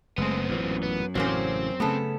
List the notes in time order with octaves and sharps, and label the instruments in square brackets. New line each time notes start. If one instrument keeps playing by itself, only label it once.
[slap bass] F#1 [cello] G#3 A3 [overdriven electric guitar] B3 C4
[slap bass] A1 A#2 [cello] F#2
[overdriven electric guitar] B3
[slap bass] A1 A2 C#3 [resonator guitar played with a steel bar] F#3 A#3 C#4 [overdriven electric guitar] C4 C5
[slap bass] C#3 A3 [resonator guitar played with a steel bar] B3 C#4 A4